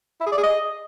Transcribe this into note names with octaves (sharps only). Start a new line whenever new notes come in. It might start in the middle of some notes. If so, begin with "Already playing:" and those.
E4
G#4
D5
G#4
D#5